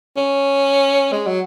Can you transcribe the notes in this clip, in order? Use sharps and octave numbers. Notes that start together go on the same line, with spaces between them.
C#4
G#3
F#3